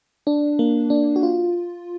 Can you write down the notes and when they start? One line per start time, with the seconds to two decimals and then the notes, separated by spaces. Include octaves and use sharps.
0.27 D4
0.59 A#3
0.90 D4
1.16 F#4
1.23 F4